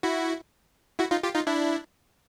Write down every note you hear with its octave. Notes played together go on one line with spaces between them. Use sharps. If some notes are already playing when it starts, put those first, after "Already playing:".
E4 F#4
E4 F#4
D#4 F4
F4 G4
D#4 F4
D4 E4